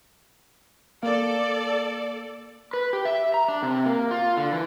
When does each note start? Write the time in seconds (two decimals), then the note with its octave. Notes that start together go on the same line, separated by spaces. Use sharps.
1.03 A#3 A4 D5 F5
2.73 B4
2.93 G4
3.05 E5
3.34 A#5
3.48 D4
3.63 C3
3.86 A#3
4.11 F4
4.37 D3
4.53 E3